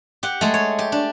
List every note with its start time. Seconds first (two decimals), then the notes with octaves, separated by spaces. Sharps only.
0.23 G4 F#5
0.41 G#3 A3
0.54 C#5
0.79 G4
0.92 D4